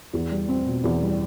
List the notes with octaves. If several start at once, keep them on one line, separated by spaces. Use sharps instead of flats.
E2
G3
C4
B2
E2
G3